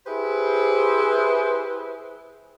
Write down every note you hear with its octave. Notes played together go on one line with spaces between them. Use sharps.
E4 G4 G#4 B4 C5